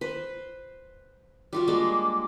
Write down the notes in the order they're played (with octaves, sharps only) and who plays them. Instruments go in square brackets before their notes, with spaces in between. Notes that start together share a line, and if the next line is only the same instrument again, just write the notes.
[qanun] B4 C5
G3 F4 F#4
G3 G#3 A#3 D4